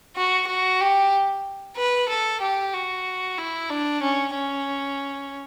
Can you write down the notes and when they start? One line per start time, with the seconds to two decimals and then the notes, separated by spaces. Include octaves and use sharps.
0.16 F#4
0.48 F#4
0.80 G4
1.77 B4
2.09 A4
2.41 G4
2.73 F#4
3.38 E4
3.70 D4
4.02 C#4
4.34 C#4